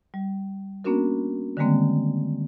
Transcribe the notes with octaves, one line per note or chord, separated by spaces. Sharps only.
G3
A#3 B3 C#4 D4 F#4 A#4
D3 D#3 G3 G#3 A#3 C4